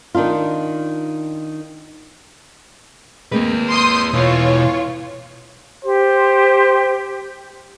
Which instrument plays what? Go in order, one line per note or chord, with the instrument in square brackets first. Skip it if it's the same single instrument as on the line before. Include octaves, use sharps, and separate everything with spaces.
[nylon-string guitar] D#3 D4 D#4 F4
[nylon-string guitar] G#3 A#3 C4 [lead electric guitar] G#4 B4
[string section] C6 D#6 G6
[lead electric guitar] B2 E4 [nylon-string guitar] E3 [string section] F4 C#5
[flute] G4 [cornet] C5